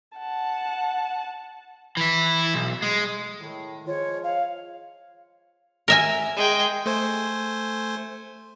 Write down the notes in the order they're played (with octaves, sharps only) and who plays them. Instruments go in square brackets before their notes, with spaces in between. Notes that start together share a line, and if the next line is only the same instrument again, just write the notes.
[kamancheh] F#5 A5
[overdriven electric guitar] E3 E4
B1
G#3
[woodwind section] A2 D#3
[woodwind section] F3 G#3 F4 [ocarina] C#5
[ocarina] F5
[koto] A#4 E5 G#5
[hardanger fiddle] G#3 G5
[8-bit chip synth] A3 C5 G#5